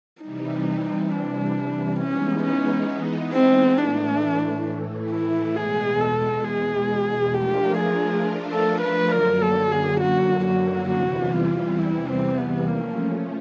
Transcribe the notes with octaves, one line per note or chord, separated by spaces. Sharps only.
C3 E3 G3 D#4
D4
E3 G#3 B3 C#4 D#4
C#4
C4
A2 E3 A3 D4
E4
E2 B2 G#3 G#4
A4
G#4
F3 A3 D4 F4 G4 A#4
G#4
A4
B4
F#2 D3 F#3 A#3 A#4
A4
G#4
F#4
F#4
E2 C3 E3 G3 F#4
F4
E4
C4
B3
F3 A3 A#3 C#4